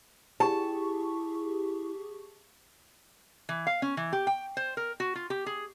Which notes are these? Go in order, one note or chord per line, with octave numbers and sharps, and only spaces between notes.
E4 G4 G#4 A5 C#6
E3
F5
C#4
E3
G4
G5
C5
A#4
F#4
F4
G4
G#4